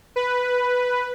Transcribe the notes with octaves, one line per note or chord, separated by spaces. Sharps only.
B4